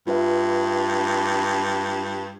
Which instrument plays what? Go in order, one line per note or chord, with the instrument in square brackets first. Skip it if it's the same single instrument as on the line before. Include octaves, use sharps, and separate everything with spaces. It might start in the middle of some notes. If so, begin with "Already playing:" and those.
[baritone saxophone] G2 [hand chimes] F4 B4 E5